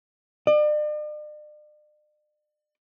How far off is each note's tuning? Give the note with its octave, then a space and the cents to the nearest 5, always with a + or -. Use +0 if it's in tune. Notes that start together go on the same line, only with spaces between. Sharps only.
D5 +45